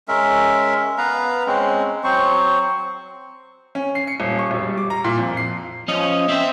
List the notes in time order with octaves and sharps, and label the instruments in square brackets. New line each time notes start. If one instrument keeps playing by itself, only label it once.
[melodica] G#3 C#4 A#4 E5
B3 B4 F5 A#5
G#3 C4 C#4
F#3 C4 C5 C#6
[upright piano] C#4
C7
C#7
D#1
C#6
E1
G3
D6
A#5
A#2
F2
C7
[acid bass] F3 [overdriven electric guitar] C#4 [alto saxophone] D#5
[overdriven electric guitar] C4 C5 [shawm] E5